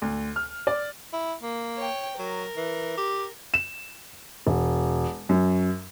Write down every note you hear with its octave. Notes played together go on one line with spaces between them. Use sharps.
D2
F6
D5
E4
A#3
C#5 G5
F#3 A#4
E3
G4
E7
E1
F#2